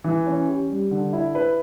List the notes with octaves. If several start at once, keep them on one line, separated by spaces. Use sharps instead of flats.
E3
C#4
G4
G3
D3
E4
B4